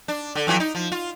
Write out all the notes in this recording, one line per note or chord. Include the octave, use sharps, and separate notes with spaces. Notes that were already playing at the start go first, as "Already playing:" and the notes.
D4
D3
F2 E3 F#3
D#4
F3
F4